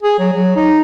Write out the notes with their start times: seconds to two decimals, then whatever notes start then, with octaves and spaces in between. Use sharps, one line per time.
0.03 G#4
0.19 F#3
0.33 F#3
0.56 D#4